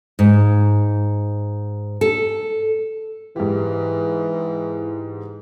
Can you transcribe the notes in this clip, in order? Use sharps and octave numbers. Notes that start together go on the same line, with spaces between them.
G#2
A4
G#2 E3 G4